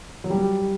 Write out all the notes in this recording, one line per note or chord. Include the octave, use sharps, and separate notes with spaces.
F#3
G3